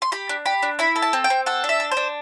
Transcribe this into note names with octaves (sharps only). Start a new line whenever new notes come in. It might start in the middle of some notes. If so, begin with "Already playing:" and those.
C6
G4 B5
D4
G4 B5
D4
E4 B5
A4
A5
C4
G5
C4
A4 F#5
D4
E5
A4
C5
D4